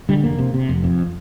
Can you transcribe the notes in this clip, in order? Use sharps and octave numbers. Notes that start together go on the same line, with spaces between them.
D3 G3
F1 A#3
C3
C3
F1
F2